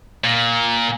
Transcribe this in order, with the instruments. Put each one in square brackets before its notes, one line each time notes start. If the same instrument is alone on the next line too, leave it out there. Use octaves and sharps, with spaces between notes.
[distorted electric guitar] A#2